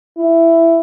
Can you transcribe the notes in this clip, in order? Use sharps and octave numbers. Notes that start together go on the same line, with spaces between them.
E4